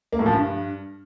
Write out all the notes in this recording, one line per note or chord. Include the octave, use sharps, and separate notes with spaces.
A#3
A2
F3
G2